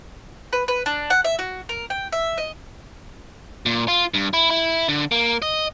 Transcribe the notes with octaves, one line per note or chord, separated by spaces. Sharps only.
B4
B4
D4
F#5
E5
F#4
A#4
G5
E5
D#5
A#2
F4
G2
E4
E4
D3
A#3
D#5